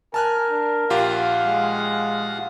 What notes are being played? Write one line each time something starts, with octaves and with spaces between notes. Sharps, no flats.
A#4 G#5 A5 F6 F#6
D4
A#1 F4 G4 F5 F#5
G#3